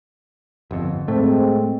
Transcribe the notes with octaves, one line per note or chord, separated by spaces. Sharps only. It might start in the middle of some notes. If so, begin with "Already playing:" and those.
G1 F2
A2 G#3 A3 C4